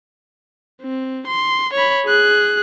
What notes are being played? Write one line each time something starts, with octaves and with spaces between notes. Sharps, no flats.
C4
C6
C#5 B5
G#4 F#6